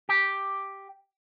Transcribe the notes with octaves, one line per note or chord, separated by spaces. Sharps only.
G4